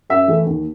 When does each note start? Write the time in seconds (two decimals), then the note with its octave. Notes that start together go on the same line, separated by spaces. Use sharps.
0.09 F#2 E5
0.28 E3 A3
0.46 D#2